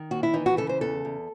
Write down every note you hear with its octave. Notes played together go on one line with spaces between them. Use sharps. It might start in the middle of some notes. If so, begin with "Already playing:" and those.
Already playing: D#3
D#2 F#4
E4
E3 D#4
F#4
C#3 A4
C5
E2 A4
E2